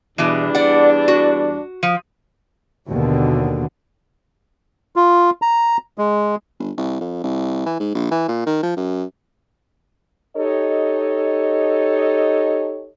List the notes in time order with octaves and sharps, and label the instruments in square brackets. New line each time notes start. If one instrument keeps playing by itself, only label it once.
[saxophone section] E2 G3 D4 [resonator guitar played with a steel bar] B2 E3
[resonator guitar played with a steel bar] D5 F#5
F#4
F3
[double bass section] D#2 B2 D3
[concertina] F4
A#5
G#3
[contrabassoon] G1
C2
F2
C2
E3
G#2
A#1
E3
A#2
D#3
F3
F#2
[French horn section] D#4 G4 A4 C#5 D#5